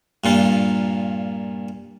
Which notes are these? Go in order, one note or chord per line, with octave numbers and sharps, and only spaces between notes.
G2 A#2 F4